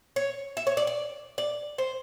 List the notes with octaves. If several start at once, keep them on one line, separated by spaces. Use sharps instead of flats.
C#5
E5
C#5
D5
D5
D5
C5